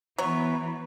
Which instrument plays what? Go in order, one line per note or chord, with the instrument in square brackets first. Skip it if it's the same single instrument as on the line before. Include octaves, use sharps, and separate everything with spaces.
[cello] E3 B3 [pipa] F#3 C#5